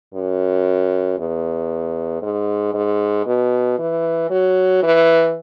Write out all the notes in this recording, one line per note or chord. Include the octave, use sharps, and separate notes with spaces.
F#2
E2
G#2
G#2
B2
E3
F#3
E3